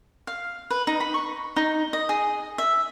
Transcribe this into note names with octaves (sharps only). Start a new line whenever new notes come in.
F5
B4
D#4
B5
C#6
D#4
D#5
G#4
E5